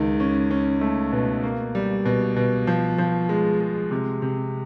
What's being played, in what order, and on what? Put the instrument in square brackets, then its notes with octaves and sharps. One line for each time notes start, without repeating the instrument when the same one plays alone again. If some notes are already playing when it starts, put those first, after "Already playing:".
Already playing: [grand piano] C#2 D#3
C#4
C#4
A3
B2
A#3
G3
B2
B2
F3
F3
G#3
G#3
C3
C3